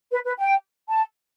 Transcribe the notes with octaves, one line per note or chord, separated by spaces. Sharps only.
B4
B4
G5
A5